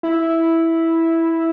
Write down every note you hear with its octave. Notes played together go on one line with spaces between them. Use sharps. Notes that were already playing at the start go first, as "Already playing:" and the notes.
E4